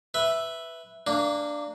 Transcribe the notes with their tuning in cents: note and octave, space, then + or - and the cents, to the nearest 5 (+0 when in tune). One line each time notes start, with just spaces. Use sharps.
B4 +0 E5 +0
A#3 -20 D4 +0